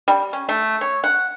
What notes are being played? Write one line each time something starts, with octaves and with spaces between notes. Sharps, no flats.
G3
C#4
A3
C#5
F#5